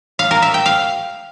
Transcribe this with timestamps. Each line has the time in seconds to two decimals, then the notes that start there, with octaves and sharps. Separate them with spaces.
0.19 F5
0.31 A#4
0.42 E5
0.54 G5
0.66 F5